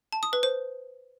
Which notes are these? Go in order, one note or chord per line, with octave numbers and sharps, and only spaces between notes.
A5
D#6
B4
C5